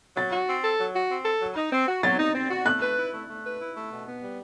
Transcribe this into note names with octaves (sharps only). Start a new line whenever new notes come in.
F#3 A6
F#4
C4
A4
F#3
F#4
C4
A4
F#3
D#4
C4
F#4
F#3 A6
D#4
C4
F#4
A3 F#6
B4
E4
A3
A3
B4
E4
A3
B2
B3
G3